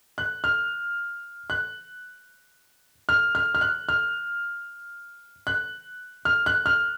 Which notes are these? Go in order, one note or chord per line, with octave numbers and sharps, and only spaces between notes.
F#6
F6
F#6
F6
F6
F6
F#6
F6
F#6
F6
F#6
F6